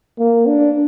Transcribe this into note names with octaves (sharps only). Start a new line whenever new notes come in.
A#3
D4